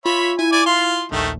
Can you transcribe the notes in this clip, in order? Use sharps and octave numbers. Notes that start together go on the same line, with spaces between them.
F4 C#5 E5 B5 B6
E4 G#5
D5 G#5 D6
F4 C6
A#1 D#2 D#3 A3